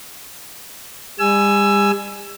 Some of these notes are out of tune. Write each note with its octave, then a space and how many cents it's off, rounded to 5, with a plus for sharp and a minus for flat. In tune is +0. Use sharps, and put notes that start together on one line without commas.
G3 +40 G#5 +10 E6 +20